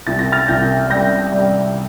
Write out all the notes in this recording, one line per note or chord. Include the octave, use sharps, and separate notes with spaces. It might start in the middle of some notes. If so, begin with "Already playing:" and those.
C2 A6
A#6
F6 A6
C2 G6 A#6
G3 G6 A#6
G3